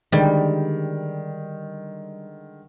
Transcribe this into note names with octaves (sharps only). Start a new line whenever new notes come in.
D3 D#3 G3 G#3